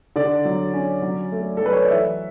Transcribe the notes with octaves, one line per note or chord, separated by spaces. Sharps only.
D3 D5
F#3
C#4
F#3
A3
A4
F#3 B4
C#5
D5
E3 E5